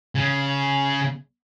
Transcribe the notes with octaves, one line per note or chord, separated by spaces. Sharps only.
C#3